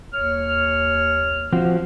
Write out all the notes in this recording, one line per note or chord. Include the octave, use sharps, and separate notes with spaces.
D#2 C#5 F6
F3 C4 F#4